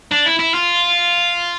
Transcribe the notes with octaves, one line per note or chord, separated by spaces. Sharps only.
D4
E4
E4
F4